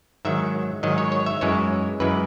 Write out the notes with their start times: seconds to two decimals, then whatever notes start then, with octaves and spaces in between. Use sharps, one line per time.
0.25 G#2 D#3 F#3 E5
0.83 G#2 D#3 F#3 D#5
0.98 C#5
1.12 C#5
1.26 E5
1.41 F#2 E3 G#3 C#5
2.00 F#2 E3 G#3 B4